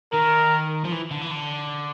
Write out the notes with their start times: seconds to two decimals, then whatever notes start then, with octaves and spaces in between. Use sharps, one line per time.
0.14 D#3 A#4
0.85 F3
0.92 E3
1.11 D3
1.21 E3
1.31 D3